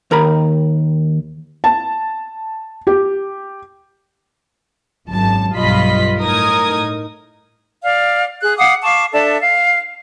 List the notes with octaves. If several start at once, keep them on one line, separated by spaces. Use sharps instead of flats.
D#2 A#4 A#5 B5
A5
G4
G#1 F#2 A5
B1 G2 F4 D#5 B5 B6
A2 D#4 A#4 D#6 G#6
D5 F5
G#4 F#6
F5 F#5 D6 D#6
F5 A5 C#6 D6
D4 A4 E5 A5
F5